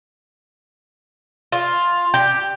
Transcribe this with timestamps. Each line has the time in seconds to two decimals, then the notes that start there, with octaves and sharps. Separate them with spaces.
1.52 F4
2.14 G4